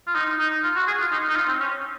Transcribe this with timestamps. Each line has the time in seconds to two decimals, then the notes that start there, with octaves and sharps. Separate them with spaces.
0.07 F4
0.15 D#4
0.40 D#4
0.64 F4
0.76 F#4
0.87 G#4
1.00 F4
1.12 D#4
1.29 D#4
1.36 F4
1.48 C4
1.60 C#4